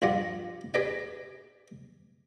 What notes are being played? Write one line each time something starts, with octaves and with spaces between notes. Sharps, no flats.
A#1 G2 F4 G4 D#5 F#5
G4 G#4 B4 D5 D#5 G5